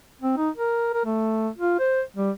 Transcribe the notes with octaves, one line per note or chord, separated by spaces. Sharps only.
C4
D#4
A#4
A#4
A3
F4
C5
G3